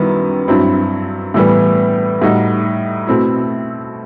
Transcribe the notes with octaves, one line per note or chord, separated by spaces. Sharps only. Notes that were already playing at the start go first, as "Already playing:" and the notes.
Already playing: F#2 D#3 G3 B3 E4
G2 F#3 C4 E4
A2 E3 G3 B3
A2 G3 D#4 F#4
B2 A3 C4 E4